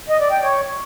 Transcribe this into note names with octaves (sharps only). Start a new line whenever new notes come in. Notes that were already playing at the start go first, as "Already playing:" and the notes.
D#5
D5
G5
C#5